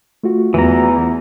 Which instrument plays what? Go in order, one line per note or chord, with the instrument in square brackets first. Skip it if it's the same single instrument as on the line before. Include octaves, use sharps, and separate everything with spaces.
[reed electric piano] A3 F4 F#4
[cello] E2 [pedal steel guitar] E3 A#5